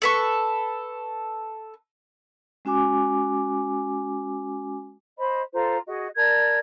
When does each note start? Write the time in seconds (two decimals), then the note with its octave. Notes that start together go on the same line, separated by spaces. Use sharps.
0.02 A4 B4 C#6
2.65 G#3 C#4 F#4 G#5 D6
5.18 C5 D#5 B5
5.54 F4 A4 C5 A#5
5.86 F#4 G#4 D#5
6.16 A#4 D5 A5 G#6